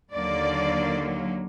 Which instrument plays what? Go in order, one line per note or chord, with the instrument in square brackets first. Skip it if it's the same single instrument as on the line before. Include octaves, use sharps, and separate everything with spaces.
[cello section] D#2 D3 F#3 A#3 D5